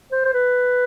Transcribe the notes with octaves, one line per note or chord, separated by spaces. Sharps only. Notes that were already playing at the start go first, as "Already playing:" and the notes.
C5
C5
B4